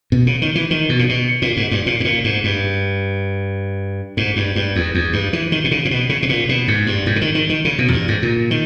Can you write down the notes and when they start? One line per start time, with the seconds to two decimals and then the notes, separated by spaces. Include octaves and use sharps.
0.12 B2
0.27 C#3
0.42 D#3
0.55 E3
0.71 D#3
0.89 B2
0.99 A#2
1.09 B2
1.42 A#2
1.57 G#2
1.71 G2
1.86 A#2
2.00 G#2
2.05 A#2
2.24 G#2
2.44 G2
4.17 G#2
4.36 G2
4.56 G2
4.76 E2
4.95 E2
5.13 G2
5.33 E3
5.52 D#3
5.64 B2
5.71 C#3
5.85 A#2
5.91 B2
6.09 C#3
6.23 B2
6.29 A#2
6.49 B2
6.68 G#2
6.87 G2
7.06 G#2
7.16 C#3
7.21 D#3
7.35 D#3
7.49 D#3
7.65 C#3
7.79 B2
7.88 E2
7.93 G2
8.08 G#2
8.22 A#2
8.51 D#3